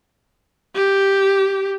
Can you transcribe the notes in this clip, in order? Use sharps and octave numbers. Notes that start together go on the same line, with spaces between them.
G4